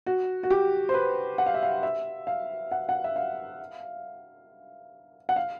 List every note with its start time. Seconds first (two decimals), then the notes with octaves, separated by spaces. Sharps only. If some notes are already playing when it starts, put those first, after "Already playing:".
0.07 F#4
0.43 F#4
0.50 G4
0.89 C5
0.94 B4
1.38 F#5
1.46 F5
1.54 E5
1.63 F5
1.83 E5
2.27 F5
2.72 F#5
2.89 F#5
3.04 E5
3.16 F5
5.29 F#5
5.36 F5